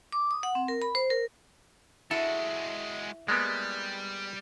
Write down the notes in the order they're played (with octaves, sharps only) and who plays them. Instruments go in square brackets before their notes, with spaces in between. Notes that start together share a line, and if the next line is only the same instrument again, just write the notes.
[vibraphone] D6
D#6
F#5
C4
A#4
B5
C5
A#4
[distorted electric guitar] G#3 F#4 [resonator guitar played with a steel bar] E4 [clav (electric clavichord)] A4
[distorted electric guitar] G3 [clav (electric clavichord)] G#3 A#3 B3